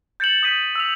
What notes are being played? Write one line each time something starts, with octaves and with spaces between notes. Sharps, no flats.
G6 A6 C#7 E7 F#7
D#6 G6 B6 D#7
E6 B6 F7